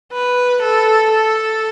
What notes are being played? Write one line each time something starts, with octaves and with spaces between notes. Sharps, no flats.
B4
A4
A4